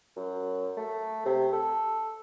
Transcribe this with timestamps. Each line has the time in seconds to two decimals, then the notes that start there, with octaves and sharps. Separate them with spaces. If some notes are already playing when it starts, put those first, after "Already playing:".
0.17 F#2
0.77 A3
1.26 C3
1.53 A4